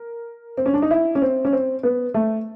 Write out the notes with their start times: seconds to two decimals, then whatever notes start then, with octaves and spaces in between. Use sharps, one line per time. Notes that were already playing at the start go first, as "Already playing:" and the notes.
Already playing: A#4
0.57 C4
0.66 C#4
0.73 D4
0.82 D#4
0.91 E4
1.15 C#4
1.22 C4
1.45 C#4
1.53 C4
1.83 B3
2.14 A3